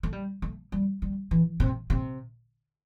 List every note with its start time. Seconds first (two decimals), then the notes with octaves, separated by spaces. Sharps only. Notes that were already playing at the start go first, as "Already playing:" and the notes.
0.03 A3
0.13 G3
0.42 A3
0.72 G3
1.02 G3
1.31 E3
1.60 C3
1.90 C3